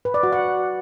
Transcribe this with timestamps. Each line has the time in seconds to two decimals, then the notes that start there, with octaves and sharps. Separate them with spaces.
0.05 B4
0.14 D5
0.23 F#4
0.33 F#5